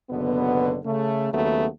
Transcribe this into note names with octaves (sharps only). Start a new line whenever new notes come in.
F#1 B2 D3 B3
C#3 A3
D#2 C#3 F#3 A3 B3